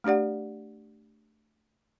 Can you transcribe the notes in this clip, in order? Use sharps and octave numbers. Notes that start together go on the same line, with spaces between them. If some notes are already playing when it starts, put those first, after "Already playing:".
A3 D4 G4 D5 F#5